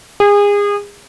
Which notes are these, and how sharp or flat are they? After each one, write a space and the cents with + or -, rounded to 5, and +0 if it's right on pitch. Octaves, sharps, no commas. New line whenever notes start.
G#4 -30